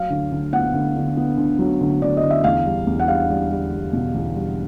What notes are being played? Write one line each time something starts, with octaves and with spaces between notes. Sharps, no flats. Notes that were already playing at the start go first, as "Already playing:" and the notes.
Already playing: F#3 F5
D2
D2
B3 F#5
D2
D3
B3
D2
F#3
D2
D2 D5
D#5
D2
E5
E2 F5
G3
E2
F#5
G3 F5
G3
G3
G3
B2
E2
G3